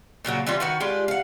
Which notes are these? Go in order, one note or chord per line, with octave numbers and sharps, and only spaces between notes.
A#2 C#3 F#3 A#3
E3 G3 C#4 F4
D#3 F#4 B4
G#3 D4 F4 G4
F5 F#5